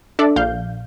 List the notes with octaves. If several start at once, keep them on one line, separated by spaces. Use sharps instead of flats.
D4 A4 D5 E5
A#1 F5 G6